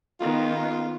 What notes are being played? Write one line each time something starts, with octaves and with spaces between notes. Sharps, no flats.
D#3 B3 F4